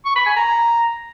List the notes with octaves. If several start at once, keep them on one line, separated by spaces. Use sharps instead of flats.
C#6
B5
G#5
A#5